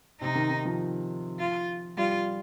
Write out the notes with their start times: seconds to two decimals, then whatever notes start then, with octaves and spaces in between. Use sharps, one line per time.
0.21 C3 D#4
0.35 D#3
0.51 D#3
0.65 F3
1.39 F4
1.97 G3 F4